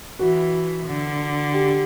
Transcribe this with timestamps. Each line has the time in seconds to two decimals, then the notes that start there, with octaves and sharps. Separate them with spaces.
0.19 E3 F#4
0.86 D3
1.53 G4